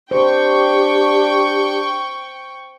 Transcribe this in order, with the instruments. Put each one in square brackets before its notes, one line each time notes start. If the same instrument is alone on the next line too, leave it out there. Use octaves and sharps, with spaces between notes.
[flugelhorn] D4 [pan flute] G4 [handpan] C5 [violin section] G5 C#6